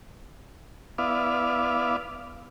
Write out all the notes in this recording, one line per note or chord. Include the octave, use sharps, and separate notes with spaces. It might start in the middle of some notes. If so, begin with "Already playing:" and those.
B3 E4 D5 F5